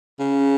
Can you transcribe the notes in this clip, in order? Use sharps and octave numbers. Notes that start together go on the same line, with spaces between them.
C#3